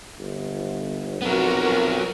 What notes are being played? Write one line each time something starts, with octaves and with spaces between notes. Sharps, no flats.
G1
F2 F#3 B3 F#4 A#4